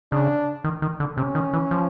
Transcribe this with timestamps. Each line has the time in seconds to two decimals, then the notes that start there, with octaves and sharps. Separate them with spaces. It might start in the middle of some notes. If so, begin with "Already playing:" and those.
0.12 C#3 D4
0.64 D#3
0.82 D#3
1.00 D3
1.17 C3 C#4
1.35 D#3
1.53 E3
1.71 F3